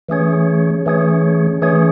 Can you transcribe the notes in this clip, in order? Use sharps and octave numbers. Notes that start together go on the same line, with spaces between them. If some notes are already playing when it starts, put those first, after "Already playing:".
E3 A3 C#4 G#4 C#5
E3 A3 C#4 G#4 C#5
E3 A3 C#4 G#4 C#5